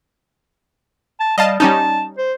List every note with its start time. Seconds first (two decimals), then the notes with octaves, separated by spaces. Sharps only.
1.20 A5
1.38 G3 D#5 F5 A5
1.60 G3 C#4 D#4 A5
2.18 C5